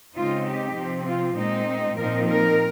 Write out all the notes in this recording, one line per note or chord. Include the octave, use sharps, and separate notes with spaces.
C#3 G#3 C4 D#4 F4
G4
C3 F3 C4
F4
A#2 G#3 C4 D#4
A#2 F3 C4 D#4 A#4
A#4